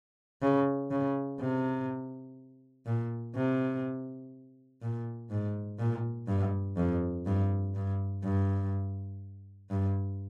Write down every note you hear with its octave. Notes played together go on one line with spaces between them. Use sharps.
C#3
C#3
C3
A#2
C3
A#2
G#2
A#2
G2
F2
G2
G2
G2
G2